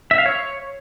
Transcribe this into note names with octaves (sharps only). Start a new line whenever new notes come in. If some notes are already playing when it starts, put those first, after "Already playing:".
E5
F5
C#5